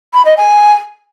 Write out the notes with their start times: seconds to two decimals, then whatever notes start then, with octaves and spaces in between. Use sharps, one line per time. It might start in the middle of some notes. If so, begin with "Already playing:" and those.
0.13 B5
0.25 D#5
0.37 G#5